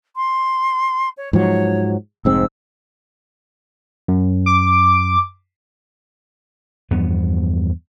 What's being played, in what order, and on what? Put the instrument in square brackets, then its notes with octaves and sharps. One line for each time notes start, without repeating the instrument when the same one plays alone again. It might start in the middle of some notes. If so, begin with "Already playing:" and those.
[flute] C6
C#5
[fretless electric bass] G#2 F3 F#3 [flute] C#5
[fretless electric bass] F1 G#2 C4 [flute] E6
[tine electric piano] F#2
[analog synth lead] D6
[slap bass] E2 G2 F3 B3